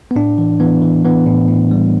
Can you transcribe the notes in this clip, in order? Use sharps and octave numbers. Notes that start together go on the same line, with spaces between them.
B3
A2 D4
E3
E3 B3
E3
E3 B3
A2
A2
G3